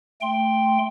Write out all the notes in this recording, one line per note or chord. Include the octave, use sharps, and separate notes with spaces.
A3 G5 C6